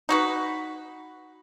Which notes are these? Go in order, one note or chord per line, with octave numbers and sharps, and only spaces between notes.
D#4 F#4 B4